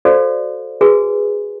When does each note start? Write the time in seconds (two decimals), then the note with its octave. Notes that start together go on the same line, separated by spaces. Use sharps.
0.05 F#4 A4 C5 D5 F5
0.81 F#4 G#4 B4 G#5